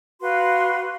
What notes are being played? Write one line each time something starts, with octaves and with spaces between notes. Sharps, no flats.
F#4 B4 F5 C6